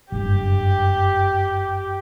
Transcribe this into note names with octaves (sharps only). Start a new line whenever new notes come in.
F#1 G2 G4